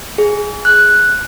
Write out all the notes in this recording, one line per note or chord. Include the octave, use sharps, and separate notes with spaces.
G#4
F#6